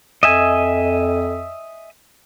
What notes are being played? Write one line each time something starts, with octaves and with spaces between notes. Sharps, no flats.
F2 D#5 E5 G#5